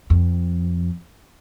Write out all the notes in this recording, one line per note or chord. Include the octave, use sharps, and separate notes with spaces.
F2